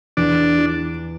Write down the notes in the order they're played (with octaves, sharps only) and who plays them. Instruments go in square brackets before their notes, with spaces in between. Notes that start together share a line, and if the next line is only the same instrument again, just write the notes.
[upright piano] E2 [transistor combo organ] D4
[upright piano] E3